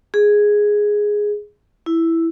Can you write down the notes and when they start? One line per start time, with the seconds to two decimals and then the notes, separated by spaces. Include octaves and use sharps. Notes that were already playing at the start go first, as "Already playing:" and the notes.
0.14 G#4
1.86 E4